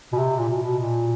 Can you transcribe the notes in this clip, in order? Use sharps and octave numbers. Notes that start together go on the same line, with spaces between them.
B2
C3
A#2
B2
B2
A#2